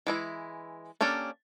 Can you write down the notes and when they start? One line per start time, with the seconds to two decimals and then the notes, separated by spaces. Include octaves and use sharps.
0.07 E3 G#3 E4
1.01 A#3 C#4 D4 G4 A4